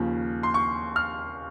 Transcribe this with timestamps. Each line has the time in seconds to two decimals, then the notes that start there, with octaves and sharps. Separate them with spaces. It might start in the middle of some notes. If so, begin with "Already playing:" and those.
Already playing: D#2 C#3 F3
0.43 C6
0.54 C#6
0.96 F6